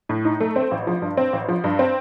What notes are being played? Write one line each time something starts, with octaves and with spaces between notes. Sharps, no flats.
A2
D#4
A3
C4
A1
F3
G2
C4
A1
F3
G2
C4